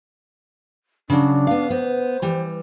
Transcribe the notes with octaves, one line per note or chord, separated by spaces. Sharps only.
C#3 F#3 D4
B3 F5
B3 C5
E3 G3